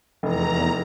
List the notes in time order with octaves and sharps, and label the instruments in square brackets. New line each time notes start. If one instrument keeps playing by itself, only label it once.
[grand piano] F1 [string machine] E2 A#5